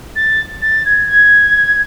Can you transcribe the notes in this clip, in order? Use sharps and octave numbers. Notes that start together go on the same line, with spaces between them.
A6
A6
G#6
G#6